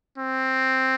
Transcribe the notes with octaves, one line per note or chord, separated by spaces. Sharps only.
C4